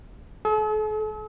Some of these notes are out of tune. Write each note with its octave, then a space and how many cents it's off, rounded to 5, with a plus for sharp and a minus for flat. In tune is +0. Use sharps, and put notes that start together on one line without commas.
A4 -45